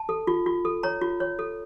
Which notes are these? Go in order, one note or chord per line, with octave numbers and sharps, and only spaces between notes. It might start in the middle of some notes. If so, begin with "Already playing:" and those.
Already playing: A5
A4
F4
F4
A4
C#5 A#5
F4
C#5
A4